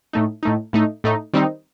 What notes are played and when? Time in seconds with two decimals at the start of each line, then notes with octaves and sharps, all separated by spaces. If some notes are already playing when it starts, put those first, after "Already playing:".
0.13 A2 A3 D#4
0.43 A2 A3 D#4
0.73 A2 A3 D#4
1.04 A2 A3 D#4
1.33 D#3 G3 C4 D#4